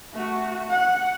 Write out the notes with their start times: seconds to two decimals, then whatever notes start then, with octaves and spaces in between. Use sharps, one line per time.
0.13 A3 F#4
0.69 F#5